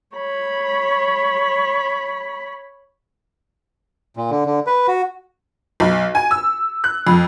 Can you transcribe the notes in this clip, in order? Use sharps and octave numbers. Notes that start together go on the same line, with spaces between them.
C#5 B5
A#2
D3
D3
B4
F#4
B1
G#5
E6
F#6
F2